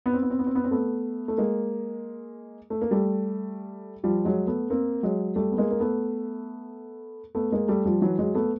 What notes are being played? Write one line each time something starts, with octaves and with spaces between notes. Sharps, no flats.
B3
C4
B3
C4
B3
C4
B3
C4
A3 B3
A3
G#3 A#3
A3
A#3
G3 A3
F3 G3
F#3 G#3
A3 B3
A#3 C4
F#3 G#3
G3 A3
B3
G#3 A#3
A#3
A3 B3
A3 B3
G#3 A#3
G3 A3
F3 G3
E3 F#3
F#3 G#3
A3 B3